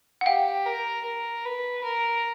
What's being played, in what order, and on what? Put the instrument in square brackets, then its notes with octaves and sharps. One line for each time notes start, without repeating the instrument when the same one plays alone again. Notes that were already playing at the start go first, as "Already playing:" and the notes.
[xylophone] F#5
[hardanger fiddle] G4 [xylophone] F5 G5
[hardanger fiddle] A#4
A#4
B4
A#4